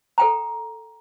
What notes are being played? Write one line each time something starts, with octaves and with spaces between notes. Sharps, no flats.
A4 G5 A#5